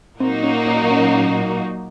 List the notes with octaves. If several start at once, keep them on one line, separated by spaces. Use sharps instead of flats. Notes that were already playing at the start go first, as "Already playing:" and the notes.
A#2 F#3 A#3 C4 D#4 F#4
C#4
C#4
C#4